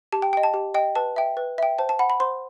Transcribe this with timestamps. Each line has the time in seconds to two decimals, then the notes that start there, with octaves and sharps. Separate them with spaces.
0.12 G4 A5
0.22 G5
0.33 D#5 G5
0.43 A5
0.54 G4
0.74 D#5 G5
0.95 B4 A5
1.16 E5 G5
1.37 B4
1.58 E5 G5
1.78 C5 A5
1.89 A5
1.99 F#5 B5
2.10 B5
2.20 C5 C6